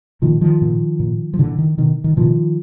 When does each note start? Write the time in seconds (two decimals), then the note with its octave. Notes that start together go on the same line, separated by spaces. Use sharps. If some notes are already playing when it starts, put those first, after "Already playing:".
0.22 A#2 D#3 F3
0.41 D#3 F3
0.62 A#2
1.00 A#2
1.34 F3
1.39 A#2 D3 E3
1.59 D#3
1.78 B2 D#3
2.04 D#3
2.17 B2 D#3 F3